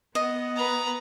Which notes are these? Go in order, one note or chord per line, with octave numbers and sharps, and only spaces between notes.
B3 D#5 F#5
B4 A#5